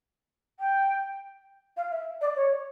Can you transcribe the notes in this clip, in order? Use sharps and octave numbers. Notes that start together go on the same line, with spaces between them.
G5
F5
E5
D5
C#5